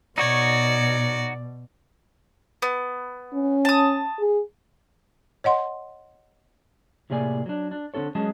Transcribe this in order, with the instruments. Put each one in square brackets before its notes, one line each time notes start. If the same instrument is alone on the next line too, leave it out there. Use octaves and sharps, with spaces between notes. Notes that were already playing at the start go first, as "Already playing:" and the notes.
[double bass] B2 [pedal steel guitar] D#4 F#4 C#5 [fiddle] D5
[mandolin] B3
[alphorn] C#4
[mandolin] A5 D#6
[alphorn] G#4
[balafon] C#5 D#5 F#5 C6
[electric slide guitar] A2 C3 A#3 G#4 D5 G#5
F#3 D4
D4
D3 C4 F4 A4 C#5
F#3 G#3 C#4 G#4 D#5 A5